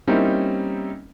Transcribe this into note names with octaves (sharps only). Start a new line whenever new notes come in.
G3 A#3 C4 C#4 D#4 E4